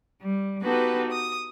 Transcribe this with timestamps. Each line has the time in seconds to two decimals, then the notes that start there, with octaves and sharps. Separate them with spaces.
0.22 G3
0.62 B3 D#4 F#4 G4 A4 B4
1.11 D#6